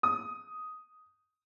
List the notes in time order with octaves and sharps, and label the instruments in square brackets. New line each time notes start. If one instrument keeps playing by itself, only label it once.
[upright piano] D#6